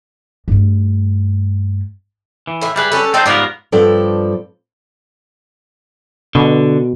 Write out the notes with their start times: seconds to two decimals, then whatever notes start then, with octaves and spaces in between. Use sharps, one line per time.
0.48 G2 A3
2.47 E3
2.61 A2 E4
2.76 G3 E4 G#4 B4
2.92 C#4 A4
3.14 C4 D#4 C5 D5 G5 A5
3.26 G#2 G3 B3 F4 A#4 D5
3.72 G2 F3 C4 A4 D5
6.35 B2 D3